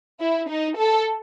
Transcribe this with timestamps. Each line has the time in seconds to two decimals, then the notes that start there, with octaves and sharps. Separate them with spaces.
0.21 E4
0.49 D#4
0.77 A4